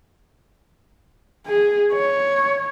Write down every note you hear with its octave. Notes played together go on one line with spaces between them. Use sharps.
G#4
C#5